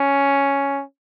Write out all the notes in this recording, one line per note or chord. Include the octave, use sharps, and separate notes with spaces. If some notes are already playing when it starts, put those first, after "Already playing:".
Already playing: C#4